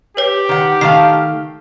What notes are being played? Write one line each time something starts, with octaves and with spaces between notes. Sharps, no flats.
G4 B4 C#5
D#3 F#5
D#3 A3 F5 C7